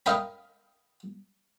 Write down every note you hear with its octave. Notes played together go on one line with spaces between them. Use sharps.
A#4 D#5 F5 G5 B5